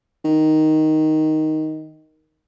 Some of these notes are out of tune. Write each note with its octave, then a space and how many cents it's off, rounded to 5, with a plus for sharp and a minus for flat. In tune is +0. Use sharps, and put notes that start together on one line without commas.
D#3 +5